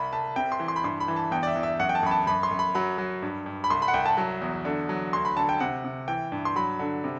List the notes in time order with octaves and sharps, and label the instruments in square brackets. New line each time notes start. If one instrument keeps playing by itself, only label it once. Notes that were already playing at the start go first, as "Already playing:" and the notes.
Already playing: [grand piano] C2 B5
C2 A5
C3 G5
C6
E3
C6
B5
G2 C6
B5
E3
A5
E2 G5
D5
E5
E2
E5
F#2 F#5
G5
A5
F#2 B5
A5
F#2 B5
C6
F#2
B5
F#3 B5
F#3
G2
G2
B5
C2 C6
B5
F#5
C2 G5
A5
F#3
E2
D3
F#3
D2 C6
B5
D3 A5
G5
C3 F#5
C3
E3 G5
G2
C6
F#3 B5
D3
C3